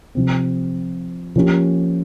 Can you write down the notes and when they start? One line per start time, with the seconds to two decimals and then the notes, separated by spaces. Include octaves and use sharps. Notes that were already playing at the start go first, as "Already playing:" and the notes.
0.15 C3 F3 C4
1.36 F3 A#3 C#4 G4